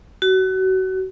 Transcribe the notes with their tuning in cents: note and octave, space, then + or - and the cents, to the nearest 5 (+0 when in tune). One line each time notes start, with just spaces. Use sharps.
F#4 +30